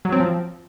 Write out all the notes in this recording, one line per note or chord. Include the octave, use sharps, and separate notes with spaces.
F#3
C4
F3